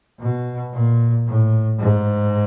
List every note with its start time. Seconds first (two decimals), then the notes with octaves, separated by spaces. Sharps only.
0.20 B2
0.73 A#2
1.27 A2
1.80 G#2